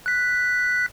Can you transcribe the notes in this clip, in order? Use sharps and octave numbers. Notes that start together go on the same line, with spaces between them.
F#6 B6